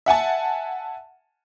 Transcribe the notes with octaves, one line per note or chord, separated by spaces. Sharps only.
E5 F#5 G#5 A5